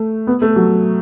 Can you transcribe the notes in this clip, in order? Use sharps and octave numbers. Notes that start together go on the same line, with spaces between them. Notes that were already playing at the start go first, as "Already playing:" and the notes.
Already playing: A3
B3
A3
F#3